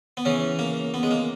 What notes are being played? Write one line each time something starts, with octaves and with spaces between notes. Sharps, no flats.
B3
C#3 E3 C#4
A#3
B3
G#3
A#3